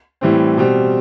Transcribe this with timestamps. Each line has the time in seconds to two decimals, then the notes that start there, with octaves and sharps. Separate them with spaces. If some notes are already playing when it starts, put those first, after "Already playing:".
0.21 A2 E3 G3 C4
0.57 B2 G3 C4